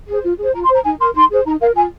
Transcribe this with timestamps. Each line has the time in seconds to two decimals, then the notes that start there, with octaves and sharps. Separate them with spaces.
0.08 G#4 C5
0.23 F4
0.38 G#4 C5
0.54 F4 A#5
0.64 C6
0.69 C5 A#5
0.84 D#4 G#5
1.00 A#4 C6
1.15 D#4 C6
1.30 G#4 C5
1.46 D#4 A#5
1.61 A#4 F5
1.75 F4 G#5